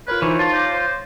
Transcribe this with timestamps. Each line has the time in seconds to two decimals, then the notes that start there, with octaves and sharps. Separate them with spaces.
0.08 F4 A#4 B4 C#5
0.22 E3 D#4 C5 C#5
0.39 F4 A5
0.52 G4 C#5 D6 A#6
0.71 C5